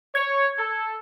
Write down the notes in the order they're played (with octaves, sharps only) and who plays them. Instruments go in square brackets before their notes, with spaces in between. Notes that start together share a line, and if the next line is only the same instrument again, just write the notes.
[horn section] C#5 [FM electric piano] G#6
[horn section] A4